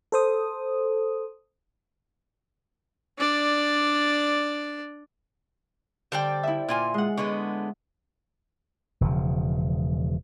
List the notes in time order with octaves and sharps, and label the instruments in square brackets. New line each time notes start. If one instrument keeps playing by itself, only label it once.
[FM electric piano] A4 C5 D#6
[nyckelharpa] D4 D5
[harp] D3 [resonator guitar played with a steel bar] G3 [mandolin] C5 D5 G5
[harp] E4 E5
[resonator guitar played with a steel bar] A#2 F4 G#5
[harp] G#3 F#5
[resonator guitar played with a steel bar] D3 G#3 B3 [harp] C#5
[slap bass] E1 C#3 F3